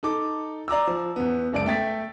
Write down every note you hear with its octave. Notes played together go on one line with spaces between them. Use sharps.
D#4 A4 D6
D5 A#5 D6 E6
F3
E2 B3
F#1 C#2 D5 A5 D7
A3 G5 A6 B6